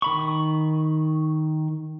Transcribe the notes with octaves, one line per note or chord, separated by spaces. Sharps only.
D#3 B5 C#6